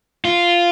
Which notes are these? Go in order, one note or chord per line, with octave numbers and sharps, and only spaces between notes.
F4